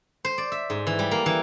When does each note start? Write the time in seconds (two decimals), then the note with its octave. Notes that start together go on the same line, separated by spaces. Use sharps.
0.25 C5
0.38 D5
0.52 E5
0.70 G#2
0.87 E3
0.99 G3
1.11 A#3
1.26 E3